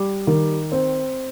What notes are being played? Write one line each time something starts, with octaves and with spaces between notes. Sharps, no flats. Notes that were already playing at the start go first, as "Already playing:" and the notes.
Already playing: G3
D#3
C4